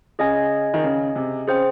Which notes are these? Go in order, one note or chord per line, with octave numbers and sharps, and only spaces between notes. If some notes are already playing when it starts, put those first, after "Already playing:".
C#3 G#4 D#5 G#5
D#3
C#3
C3
C#3 G#4 C5 G5